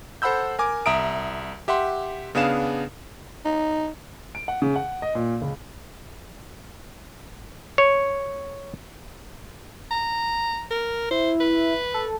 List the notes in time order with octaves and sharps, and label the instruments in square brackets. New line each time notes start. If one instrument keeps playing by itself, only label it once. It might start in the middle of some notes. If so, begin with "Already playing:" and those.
[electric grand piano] A4 C5 F#5 B5 E6 G6
A#4 G#5 D6
C2 E5 A#5 D#6 D7
G4 E5 F#5 C6
C#3 B3 D4 G#4 F5 E7
[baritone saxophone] D#4
[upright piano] D7
F#5
C#3
F#5
D#5
A#2
C#2
[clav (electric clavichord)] C#5
[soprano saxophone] A#5
A#4
[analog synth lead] E4 [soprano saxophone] C5
[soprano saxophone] B4
[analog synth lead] A4